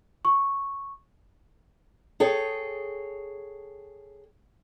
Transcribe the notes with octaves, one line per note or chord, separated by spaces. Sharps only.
C#6
G#4 A4 C#5 G5